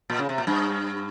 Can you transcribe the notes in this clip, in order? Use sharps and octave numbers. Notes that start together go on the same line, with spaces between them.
A#2
C#3
C3
A#2
G2